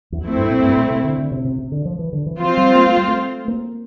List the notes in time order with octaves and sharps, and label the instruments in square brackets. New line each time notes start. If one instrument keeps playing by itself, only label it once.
[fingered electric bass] E2
[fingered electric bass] F2 [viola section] A3 C4 E4
[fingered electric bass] G2
A#2
G2
A#2
C3
D3
D3
C3
C3
C3
D3
F3
E3
D3
E3
[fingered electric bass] F3 [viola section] C4 F4 C5
[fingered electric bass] G3
A#3
A3
G3
A3
A#3